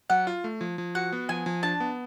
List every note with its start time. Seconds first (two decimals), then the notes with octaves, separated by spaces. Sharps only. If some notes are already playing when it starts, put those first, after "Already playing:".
0.10 F#3 F#5
0.27 F4
0.44 A3
0.61 F3
0.78 F3
0.95 F#4 F#5
1.12 B3
1.29 F3 G#5
1.46 F3
1.63 D4 A5
1.80 B3